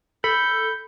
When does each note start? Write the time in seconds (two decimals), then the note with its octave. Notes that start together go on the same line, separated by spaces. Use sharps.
0.24 A4 B5 G6